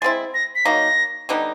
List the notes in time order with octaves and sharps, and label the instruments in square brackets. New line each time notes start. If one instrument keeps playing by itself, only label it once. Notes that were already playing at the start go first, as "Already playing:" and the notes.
[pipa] G#3 C4 E4 [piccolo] A6
[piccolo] A#6
B6
[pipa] F#3 A#3 D#4 [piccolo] A#6
[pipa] D3 G3 B3 D#4